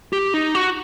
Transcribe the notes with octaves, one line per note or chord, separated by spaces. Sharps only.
G4
D#4
F#4